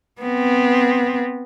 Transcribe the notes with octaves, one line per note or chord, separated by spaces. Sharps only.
B3 C4